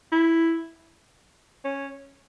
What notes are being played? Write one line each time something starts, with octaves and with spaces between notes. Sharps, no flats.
E4
C#4